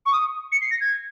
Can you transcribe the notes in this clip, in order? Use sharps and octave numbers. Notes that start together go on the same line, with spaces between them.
C#6
D#6
C#7
C7
A#6
G#6